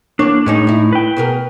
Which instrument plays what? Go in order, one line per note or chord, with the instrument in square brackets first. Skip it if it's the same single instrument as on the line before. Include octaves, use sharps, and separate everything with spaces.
[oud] E2 A#3 C#5 [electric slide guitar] D4
[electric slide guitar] A2 D#4 [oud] G#3 C#4 G#4
[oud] D4 E4
[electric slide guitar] B4 G5
[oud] B2 G#4 A#4